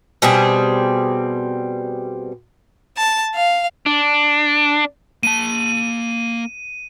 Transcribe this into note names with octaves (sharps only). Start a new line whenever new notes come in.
B2 G3 C4 G#4
A5
F5
D4
A#3 A5 D#7